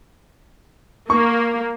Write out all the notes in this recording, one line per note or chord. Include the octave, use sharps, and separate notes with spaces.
A#3 C#6